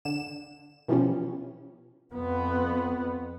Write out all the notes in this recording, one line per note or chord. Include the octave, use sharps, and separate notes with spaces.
D3 E7
B2 E3 F3 G3 C#4
F2 B3